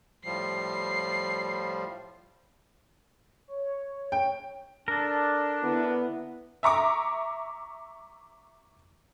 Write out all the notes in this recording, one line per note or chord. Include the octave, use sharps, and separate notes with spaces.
A2 F3 G3 C7
C#5
G5
D4 A4 A#4
D3 B3 E4
E5 A#5 C#6 D6